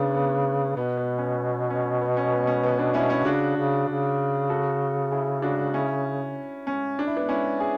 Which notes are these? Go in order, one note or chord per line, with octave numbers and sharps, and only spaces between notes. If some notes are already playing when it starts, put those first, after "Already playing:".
Already playing: C#3 B3 D4
B3
B2 B3
B3
C#4
C#4
B3
C#4
B3
C#4
B3
B3 D4
C#4 E4
C#4 E4
C#3 D4 F#4
C#3
C#3
F#4 A4
E4 G#4
D4 F#4
C#4 E4
C#4
D4
E4
B3 D4
C#4 E4
E4 G#4